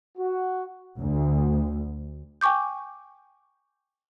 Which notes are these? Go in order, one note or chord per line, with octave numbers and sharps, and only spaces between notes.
F#4
D2
G5 G#5 C#6 D6 G6